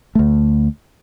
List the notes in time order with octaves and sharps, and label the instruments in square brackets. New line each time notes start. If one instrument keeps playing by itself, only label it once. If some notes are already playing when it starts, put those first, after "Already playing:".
[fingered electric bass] D2 A3